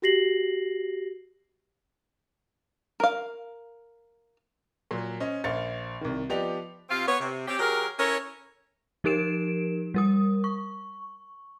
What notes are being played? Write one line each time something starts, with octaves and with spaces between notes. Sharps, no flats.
F#4 G4 A#6 C7 F#7
A#4 F5
A#2 F#3
C#4 C5 D#5
A#1 C5 F5 A6 C#7
C2 D#3
F3 B3 G4 D5 D#5 F7
C3 C4 F4
B3 C#5
C3
C4 C#4 G4
F#3 G4 G#4 A#4
C#4 E4 A4 A#4 C#5
F3 D#4 G4 A#4 D7 E7
G3 A#4 D#6
C#6